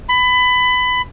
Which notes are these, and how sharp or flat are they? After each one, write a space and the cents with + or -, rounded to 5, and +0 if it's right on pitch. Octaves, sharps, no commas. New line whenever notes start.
B5 +20